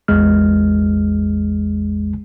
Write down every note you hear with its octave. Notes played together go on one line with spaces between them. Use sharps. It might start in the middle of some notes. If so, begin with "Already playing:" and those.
A1 E2 G#3 F6